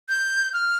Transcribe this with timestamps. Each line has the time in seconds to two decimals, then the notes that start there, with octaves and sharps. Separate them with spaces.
0.09 G6
0.53 F6